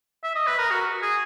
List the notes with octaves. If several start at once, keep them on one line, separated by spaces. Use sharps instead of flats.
E5
D#5
B4
A#4
F#4
G#4